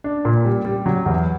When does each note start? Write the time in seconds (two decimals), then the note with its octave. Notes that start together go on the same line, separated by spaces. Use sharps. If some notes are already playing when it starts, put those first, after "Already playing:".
0.04 D4
0.25 A#2
0.45 G3
0.65 G3
0.86 F#3
1.06 E2